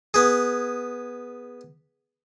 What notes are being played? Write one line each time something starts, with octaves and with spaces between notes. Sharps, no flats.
B3 G#4